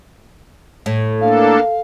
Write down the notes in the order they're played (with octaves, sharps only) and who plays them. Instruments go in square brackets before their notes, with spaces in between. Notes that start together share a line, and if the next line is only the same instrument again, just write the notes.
[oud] A2
[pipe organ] A#3 D4 A4 [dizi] F5